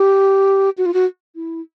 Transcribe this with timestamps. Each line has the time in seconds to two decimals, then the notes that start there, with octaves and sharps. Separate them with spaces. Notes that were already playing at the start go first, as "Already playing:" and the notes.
Already playing: G4
0.78 F#4
0.86 F4
0.94 F#4
1.35 E4